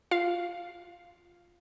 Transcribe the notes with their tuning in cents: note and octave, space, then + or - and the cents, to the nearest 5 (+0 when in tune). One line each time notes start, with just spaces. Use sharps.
F4 +0 F5 +0